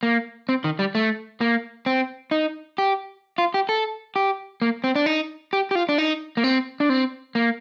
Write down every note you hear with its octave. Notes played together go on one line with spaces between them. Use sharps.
A#3
C4
D#3
G3
A3
A#3
C4
D#4
G4
F4
G4
A4
G4
A#3
C4
D4
D#4
G4
G4
F4
D4
D#4
A#3
C4
D4
C4
A#3